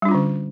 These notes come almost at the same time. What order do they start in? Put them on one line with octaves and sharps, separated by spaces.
G3 D4 F4 C#4 D3